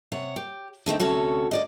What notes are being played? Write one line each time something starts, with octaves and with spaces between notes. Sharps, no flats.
C3 C#5 F#5
G4
D3 A3 C4 D#4
D2 C3 C#4 F#4 A4
D2 D5 D#5